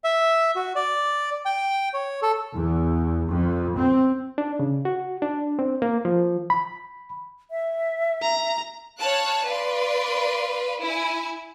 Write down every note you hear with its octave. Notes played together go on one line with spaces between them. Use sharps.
E5
F#4
D5
G5
C#5
A4
E2
F2
C4
D4
C#3
F#4
D4
C4
A#3
F3
B5
E5
A#5
C#5 F5 A5 F#6
B4 D5 F5 C6
E4 G#5